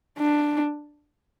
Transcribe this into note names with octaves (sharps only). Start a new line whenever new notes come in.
D4